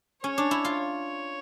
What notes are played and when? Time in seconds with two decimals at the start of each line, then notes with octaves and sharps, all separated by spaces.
0.24 C#4 C#5
0.38 D4
0.51 E4
0.65 F4
0.78 C#5